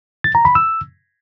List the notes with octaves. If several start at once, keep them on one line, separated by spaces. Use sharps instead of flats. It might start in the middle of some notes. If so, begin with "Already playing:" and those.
A6
A#5
B5
E6